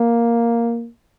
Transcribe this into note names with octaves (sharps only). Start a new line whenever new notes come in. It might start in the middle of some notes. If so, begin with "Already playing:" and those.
Already playing: A#3